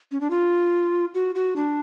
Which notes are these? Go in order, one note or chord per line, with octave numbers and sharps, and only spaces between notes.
C#4
D4
F4
F#4
F#4
D4